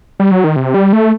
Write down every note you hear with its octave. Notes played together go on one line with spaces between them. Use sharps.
G3
F#3
D#3
C3
G3
A3